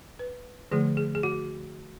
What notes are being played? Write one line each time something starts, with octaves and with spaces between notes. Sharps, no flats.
B4
D3 F3 A3 G#4
G#4
G#4
F#4